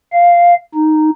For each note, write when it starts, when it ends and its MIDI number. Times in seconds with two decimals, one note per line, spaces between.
0.13 0.55 77
0.74 1.10 63